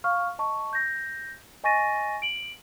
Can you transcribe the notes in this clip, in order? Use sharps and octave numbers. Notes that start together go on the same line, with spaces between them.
F5 C#6 F6
D#5 A5 C#6
G6 A#6
D#5 G#5 C#6 A6 A#6 D#7
D7 F#7